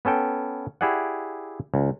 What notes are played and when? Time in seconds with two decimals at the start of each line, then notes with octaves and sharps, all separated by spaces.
0.05 B3 C#4 A4 G5
0.81 E4 G4 G#4 D5 F#5
1.74 C#2